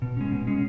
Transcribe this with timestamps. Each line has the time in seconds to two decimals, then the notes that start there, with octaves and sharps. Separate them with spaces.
0.02 B2
0.17 G#3 C#4
0.32 B2
0.47 G#3 C#4